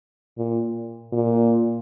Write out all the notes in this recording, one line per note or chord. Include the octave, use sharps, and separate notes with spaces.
A#2
A#2